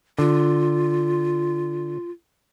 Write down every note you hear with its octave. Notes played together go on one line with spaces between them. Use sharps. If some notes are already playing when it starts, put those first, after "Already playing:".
D3 F4